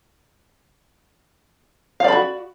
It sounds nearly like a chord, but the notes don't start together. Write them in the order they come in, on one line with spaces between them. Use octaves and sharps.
F5 D5 B5 F#4